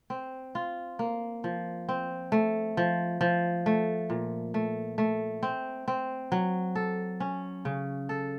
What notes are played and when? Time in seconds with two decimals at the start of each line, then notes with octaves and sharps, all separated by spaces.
0.10 C4
0.55 F4
0.99 A#3
1.44 F3
1.89 C4
2.32 A3
2.77 F3
3.21 F3
3.66 A3
4.10 A#2
4.54 A3
4.98 A3
5.43 C4
5.88 C4
6.32 F#3
6.75 A4
7.20 C#4
7.65 C#3
8.09 A4